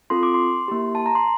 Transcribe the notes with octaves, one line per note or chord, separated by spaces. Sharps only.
C4 F4 A4 C6
D6
C6
A#3 E4 G4
A5
A#5
C6